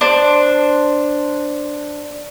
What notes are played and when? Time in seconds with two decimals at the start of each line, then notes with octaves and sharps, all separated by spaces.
0.01 D4 C5